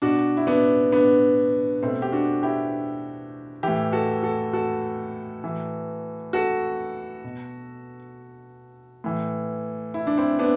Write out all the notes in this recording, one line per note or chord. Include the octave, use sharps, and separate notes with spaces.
B2 D4 F#4
E4
B3 D4
B3 D4
B2 A3 C4
G4
D4 F#4
E4 G4
A2 E3 E4 G4
F#4 A4
F#4 A4
F#4 A4
A2 E3
F#4 A4
B2
A2 E3
E4
D4
C4 E4
B3 D4